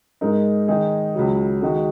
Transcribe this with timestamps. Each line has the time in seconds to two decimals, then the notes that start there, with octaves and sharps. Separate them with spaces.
0.21 G#2 G#3 D#4 A#4
0.68 D#3 G#3 D#4 G#4
1.15 C#2 C#3 F#3
1.62 D#3 G#3 F#4 D#5